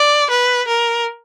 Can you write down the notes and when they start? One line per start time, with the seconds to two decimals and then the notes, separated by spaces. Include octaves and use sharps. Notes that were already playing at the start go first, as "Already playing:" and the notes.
Already playing: D5
0.30 B4
0.68 A#4